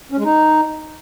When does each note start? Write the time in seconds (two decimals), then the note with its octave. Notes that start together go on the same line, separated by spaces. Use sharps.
0.12 C#4
0.18 G#3
0.25 D#4